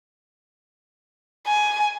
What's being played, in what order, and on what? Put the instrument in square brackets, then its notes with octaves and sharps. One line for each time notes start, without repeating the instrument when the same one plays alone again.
[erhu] G#5